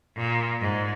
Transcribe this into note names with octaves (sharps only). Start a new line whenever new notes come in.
A#2
G#2